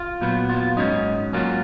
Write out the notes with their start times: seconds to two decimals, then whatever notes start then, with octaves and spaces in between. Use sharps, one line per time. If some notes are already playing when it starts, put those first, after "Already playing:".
Already playing: F4
0.21 A#2 F#3 B3
0.50 F4
0.77 G#2 F#3 C#4 D#4
1.33 G#2 F#3 A#3 C#4 F4